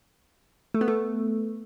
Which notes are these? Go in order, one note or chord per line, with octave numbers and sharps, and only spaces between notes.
A3
B3
A3